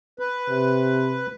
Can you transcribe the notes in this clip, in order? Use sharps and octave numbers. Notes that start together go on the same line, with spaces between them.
B4
C3